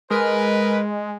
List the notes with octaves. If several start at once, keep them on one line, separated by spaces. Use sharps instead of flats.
G#3 A#4 B4